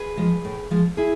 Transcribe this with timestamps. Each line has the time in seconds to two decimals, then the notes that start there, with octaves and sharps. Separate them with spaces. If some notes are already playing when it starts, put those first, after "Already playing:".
Already playing: G#4 B4
0.17 F3 G#3
0.45 A2
0.71 F3 G#3
0.97 E4 G#4